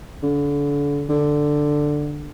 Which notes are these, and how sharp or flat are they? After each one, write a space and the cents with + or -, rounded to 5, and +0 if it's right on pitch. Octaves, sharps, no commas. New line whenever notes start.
D3 -35
D3 +5